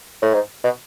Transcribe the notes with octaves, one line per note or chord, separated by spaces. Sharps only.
A2
G#2
B2